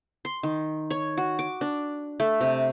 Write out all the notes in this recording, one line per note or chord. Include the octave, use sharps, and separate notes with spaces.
C6
D#3
C#5
F#4
D6
D4
A3
C3